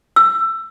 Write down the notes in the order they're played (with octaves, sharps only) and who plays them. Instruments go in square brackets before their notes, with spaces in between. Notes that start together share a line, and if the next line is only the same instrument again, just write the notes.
[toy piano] E6